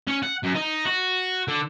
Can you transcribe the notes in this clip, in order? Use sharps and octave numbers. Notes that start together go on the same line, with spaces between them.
C#4
F#5
F#2
D#4
F#4
D3